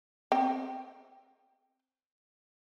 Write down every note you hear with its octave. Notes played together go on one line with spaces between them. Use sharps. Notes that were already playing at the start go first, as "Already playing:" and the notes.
C4 G5